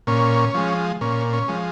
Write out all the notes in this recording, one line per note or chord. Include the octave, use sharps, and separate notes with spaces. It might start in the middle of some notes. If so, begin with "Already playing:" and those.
A#2 C#4
F3 G#3
A#2 C#4
C#4
F3 G#3